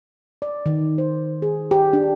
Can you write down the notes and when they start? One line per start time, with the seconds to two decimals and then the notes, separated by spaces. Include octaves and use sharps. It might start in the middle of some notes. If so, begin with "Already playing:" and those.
0.42 D5
0.66 D#3
0.98 C5
1.42 G#4
1.71 G4
1.93 D4